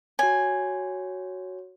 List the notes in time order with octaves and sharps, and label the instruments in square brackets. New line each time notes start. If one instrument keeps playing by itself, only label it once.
[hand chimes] F#4 C#5 [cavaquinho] G#5